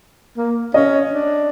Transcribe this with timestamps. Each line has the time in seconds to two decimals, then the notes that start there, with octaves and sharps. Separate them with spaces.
0.37 A#3
0.74 C#4 D#5
1.12 D4